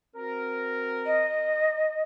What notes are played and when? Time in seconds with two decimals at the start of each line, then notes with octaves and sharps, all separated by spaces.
0.16 C4 F#4 A#4
1.06 D#5